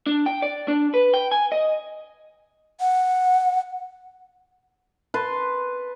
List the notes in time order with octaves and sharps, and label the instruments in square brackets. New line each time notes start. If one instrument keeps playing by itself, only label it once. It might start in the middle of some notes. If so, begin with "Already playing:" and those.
[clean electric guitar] D4
G5
D5
D4
B4
G5
G#5
D#5
[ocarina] F#5
[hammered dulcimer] B4 A5 C6